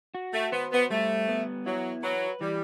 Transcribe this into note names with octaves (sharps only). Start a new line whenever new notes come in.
F#4
A3
B3 C5
B3
G3 A3
B3
F#3 E4
F#3 B4
E3 G3